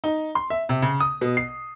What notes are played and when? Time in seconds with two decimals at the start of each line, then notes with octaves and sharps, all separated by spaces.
0.04 D#4
0.35 C6
0.50 E5
0.69 C3
0.82 C#3
1.00 D#6
1.21 B2
1.37 C7